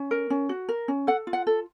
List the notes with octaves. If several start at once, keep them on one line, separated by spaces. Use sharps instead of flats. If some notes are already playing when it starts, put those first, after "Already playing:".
Already playing: C#4
A#4
C#4
F#4
A#4
C#4
A4 F#5
F4
F#5
A4